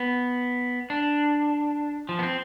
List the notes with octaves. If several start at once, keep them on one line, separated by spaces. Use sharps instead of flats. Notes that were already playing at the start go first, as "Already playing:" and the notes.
Already playing: B3
D4
F3
B3
C4